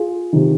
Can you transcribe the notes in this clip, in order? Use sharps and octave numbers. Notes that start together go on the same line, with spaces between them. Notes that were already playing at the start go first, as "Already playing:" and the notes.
Already playing: F4 G#4
C3 D#3